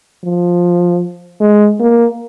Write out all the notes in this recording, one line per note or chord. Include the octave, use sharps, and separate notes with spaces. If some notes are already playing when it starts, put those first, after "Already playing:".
F3
G#3
A#3